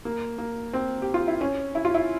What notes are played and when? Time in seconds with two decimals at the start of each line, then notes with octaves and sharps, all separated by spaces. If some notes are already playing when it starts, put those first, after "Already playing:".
0.05 A#3
0.38 A#3
0.73 C4
1.02 G4
1.14 F4
1.28 E4
1.41 C#4
1.75 E4
1.85 F4
1.94 E4